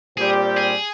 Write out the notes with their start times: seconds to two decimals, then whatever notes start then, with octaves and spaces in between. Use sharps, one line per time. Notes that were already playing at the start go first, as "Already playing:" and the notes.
0.17 A#2 G3 C4 G4 G#4
0.57 G#4